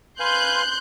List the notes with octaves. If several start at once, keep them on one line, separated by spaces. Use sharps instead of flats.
B4 F5 G#5 C6 F#6 G6